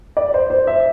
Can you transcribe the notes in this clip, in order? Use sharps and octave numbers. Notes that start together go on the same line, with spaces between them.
D5
C5
C5
E5